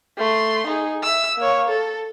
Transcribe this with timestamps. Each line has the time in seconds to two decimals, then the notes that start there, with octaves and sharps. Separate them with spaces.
0.18 A3 C6
0.67 D#4 G#4
1.03 E5 E6
1.38 A#3 C#5
1.69 A4